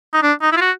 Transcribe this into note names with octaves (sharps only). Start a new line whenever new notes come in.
D#4
D4
D#4
E4
F4
F#4